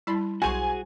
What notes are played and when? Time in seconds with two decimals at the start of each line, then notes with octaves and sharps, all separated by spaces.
0.07 G3 E4 D5 A5 B5 C6
0.42 B1 F#4 G#4 C5 G#5 C#6